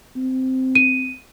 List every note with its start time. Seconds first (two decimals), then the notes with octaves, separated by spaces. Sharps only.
0.16 C4
0.75 D#7